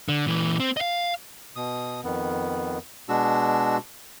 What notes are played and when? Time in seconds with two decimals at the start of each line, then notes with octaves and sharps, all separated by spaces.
0.09 D3
0.27 A#2 E3
0.60 C4
0.77 D#5 F5
1.56 B2 D#6
2.04 F2 D#3 B3
3.09 B2 G#3 D4 F#4 E6